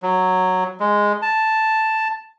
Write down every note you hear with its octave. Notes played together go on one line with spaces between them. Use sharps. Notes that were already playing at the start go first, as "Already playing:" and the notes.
F#3
G#3
A5